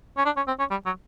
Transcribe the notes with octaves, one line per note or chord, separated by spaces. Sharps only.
C#4
D4
C#4
C4
C#4
G3
F#3